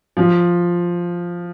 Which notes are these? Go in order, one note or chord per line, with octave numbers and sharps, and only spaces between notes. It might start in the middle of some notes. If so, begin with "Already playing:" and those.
F3